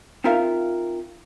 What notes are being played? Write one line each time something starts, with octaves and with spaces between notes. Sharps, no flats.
C4 D#4 F4 A#4 E5 F5